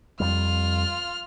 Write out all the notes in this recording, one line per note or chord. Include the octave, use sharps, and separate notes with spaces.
F2 G3 F4 F6